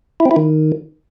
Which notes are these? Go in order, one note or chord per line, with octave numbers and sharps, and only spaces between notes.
E4
C4
E4
D#3